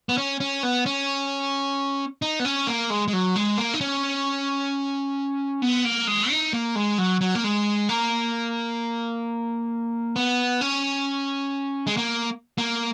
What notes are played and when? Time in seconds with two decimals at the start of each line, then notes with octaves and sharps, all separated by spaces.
0.09 B3
0.18 C#4
0.40 C#4
0.63 B3
0.86 C#4
2.22 D#4
2.40 B3
2.45 C#4
2.67 A#3
2.90 G#3
3.08 G#3
3.13 F#3
3.36 G#3
3.58 A#3
3.74 D#4
3.81 C#4
5.62 B3
5.85 A#3
6.07 G#3
6.30 D#4
6.53 A#3
6.76 G#3
6.98 F#3
7.21 F#3
7.35 A#3
7.44 G#3
7.89 A#3
10.16 B3
10.61 C#4
11.87 G#3
11.97 A#3
12.58 A#3